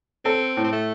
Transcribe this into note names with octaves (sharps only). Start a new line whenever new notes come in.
C4 A4
A2
C4
A3